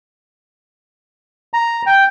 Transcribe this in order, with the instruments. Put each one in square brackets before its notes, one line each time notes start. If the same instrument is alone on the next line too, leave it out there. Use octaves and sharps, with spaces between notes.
[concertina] A#5
G5